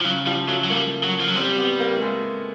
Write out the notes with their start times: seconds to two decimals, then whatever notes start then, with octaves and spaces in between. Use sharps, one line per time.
0.01 F3
0.04 C#3 F#3
0.26 F3 G3
0.48 F#3 A3
0.64 F#3
0.70 G3 A#3
1.04 F#3
1.20 F3
1.28 F#3
1.36 G3 C4
1.58 B3
1.80 A#3
1.96 A3
2.02 G#3